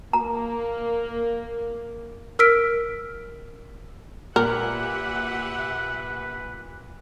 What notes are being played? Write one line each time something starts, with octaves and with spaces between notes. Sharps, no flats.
A#3 A#5
A#4 E6 F6 B6 D7
A#2 G4 A#4 B4 E5 F#5